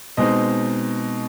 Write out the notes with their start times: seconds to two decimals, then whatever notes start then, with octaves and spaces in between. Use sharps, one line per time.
0.17 B2 G#3 C4 D#4 D#5